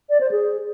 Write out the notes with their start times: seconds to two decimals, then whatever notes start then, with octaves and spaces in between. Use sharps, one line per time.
0.10 D5
0.20 C5
0.31 G#4